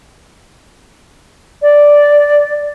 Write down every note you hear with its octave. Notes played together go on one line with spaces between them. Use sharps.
D5